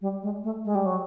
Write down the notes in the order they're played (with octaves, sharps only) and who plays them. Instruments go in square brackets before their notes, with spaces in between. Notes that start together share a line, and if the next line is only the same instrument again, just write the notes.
[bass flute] G3
G#3
A3
G#3
G3
F#3